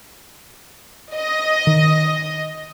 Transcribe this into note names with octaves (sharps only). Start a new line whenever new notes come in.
D#5
D#3